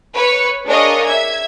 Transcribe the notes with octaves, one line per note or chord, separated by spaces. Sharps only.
B4 C#5 C#7
D4 G#4 A#4 C#5 D#5 F5
E5 G#6